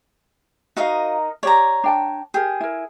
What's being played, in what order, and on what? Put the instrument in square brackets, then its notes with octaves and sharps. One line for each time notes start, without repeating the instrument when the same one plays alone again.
[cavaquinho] D#4 A#4 D#5 [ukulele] F#4 F5
[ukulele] G4 D5 [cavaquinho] C#5 A#5
[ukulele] D4 G5 A5
[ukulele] G4 A#4 [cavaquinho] G#4
[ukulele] E4 A#4